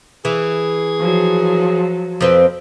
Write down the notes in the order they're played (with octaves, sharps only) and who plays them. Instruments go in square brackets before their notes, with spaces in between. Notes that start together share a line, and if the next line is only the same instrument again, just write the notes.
[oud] E3 [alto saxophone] G#4
[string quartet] F3 F#3
[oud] F2 C4 B4